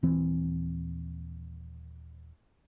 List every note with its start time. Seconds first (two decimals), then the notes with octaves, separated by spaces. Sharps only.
0.03 D#1 E3 C4